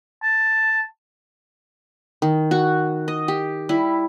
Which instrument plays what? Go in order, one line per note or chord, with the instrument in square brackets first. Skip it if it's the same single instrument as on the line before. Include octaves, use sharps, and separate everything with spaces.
[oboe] A5
[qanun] D#3
F#4 C#6
D#5
G4
G3 E4